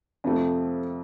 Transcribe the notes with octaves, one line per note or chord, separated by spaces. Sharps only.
F2 C3 F3 A3